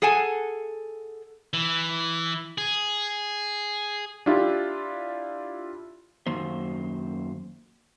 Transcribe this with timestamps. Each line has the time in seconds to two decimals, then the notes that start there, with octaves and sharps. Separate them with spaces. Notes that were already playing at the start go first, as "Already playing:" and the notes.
0.02 G#4 A4 F#5 G#5 A5
1.54 E3
2.58 G#4
4.26 D4 E4 F4 G4
6.26 F#2 D#3 A#3 C5